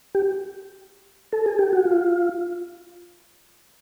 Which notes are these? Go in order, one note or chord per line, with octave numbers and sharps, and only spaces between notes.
G4
A4
G#4
G4
F#4
F4